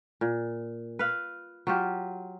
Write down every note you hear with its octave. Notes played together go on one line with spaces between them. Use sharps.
A#2
B4 F5
F#3 F4 G4